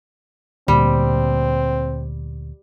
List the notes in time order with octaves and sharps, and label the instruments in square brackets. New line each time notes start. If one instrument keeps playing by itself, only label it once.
[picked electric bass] D2 A#2 [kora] G3 [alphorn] C4